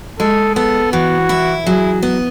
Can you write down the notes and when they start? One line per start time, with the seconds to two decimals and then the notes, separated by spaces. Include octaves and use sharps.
0.20 G#3 A4
0.55 B3 A4
0.93 E3 F#4
1.29 E4
1.66 F#3 G#4
2.03 B3